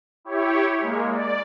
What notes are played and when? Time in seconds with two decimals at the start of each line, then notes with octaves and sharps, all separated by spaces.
0.25 E4 G4 C#5
0.80 G#3 A#3
1.11 D5